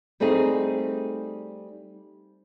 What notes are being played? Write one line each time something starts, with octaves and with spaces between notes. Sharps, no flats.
G3 A3 C4 D#4 G#4